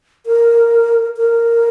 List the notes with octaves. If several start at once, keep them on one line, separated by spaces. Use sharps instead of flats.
A#4
A#4